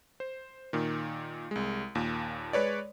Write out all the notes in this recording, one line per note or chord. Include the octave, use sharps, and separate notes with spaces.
C5
A#2 D#3
C2 G#3
D#2 A#2
G#3 B4 C#5 D5